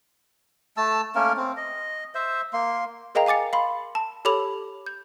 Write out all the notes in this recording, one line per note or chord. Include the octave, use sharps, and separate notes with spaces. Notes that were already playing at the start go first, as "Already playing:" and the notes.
A3 A5 E6
A3 A#3 C#4 A#4
C4
D#5
C5 E5
A#3 C6
G#4 A#4 D#5 F5 G5 A#5
F5 G#5 D6 A6 C#7
F5 B5 C6
A5
G4 A4 C#5 B5 D6 F7
G6